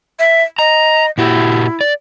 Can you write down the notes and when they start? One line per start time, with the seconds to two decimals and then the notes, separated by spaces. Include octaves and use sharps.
0.19 E5
0.59 D#5 A#5
1.18 A#2 E4 F#4 G4
1.81 D5